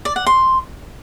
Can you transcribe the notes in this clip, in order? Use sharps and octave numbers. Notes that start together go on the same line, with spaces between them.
D5
F#5
C6